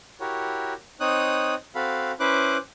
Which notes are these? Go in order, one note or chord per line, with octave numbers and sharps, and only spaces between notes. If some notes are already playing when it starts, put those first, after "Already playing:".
E4 F#4 G4 A#4 C#5
C4 D#4 C#5 D#6 F#6
C4 F#4 A4 F5 B5
C#4 E4 B4 C5 D6 F#6